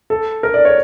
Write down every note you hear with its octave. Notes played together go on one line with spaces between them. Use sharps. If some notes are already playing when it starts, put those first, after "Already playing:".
A4
A#4
D5
C#5